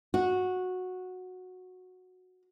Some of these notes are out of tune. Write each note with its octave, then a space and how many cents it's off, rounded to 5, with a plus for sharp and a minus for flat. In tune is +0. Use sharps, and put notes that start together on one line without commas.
F#4 -10